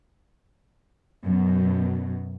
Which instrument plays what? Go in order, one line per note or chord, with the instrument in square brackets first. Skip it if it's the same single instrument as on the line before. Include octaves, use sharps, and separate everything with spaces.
[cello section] F#2 B2 F#3